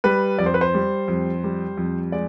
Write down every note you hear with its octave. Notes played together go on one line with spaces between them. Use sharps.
G3 B4
F2 D5
C5
B4
C5
G3
F2
G3
F2
G#3 D5